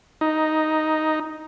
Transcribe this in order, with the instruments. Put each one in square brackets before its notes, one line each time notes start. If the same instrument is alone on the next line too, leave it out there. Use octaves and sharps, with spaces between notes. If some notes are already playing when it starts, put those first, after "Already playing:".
[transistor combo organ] D#4